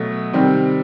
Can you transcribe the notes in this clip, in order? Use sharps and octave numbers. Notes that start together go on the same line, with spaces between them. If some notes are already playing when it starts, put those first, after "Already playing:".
Already playing: B2 F#3 A3
C3 D#3 G3 C4